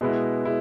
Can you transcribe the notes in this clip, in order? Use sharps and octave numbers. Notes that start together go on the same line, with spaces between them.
B2 G#3 B3 E4
G#3 E4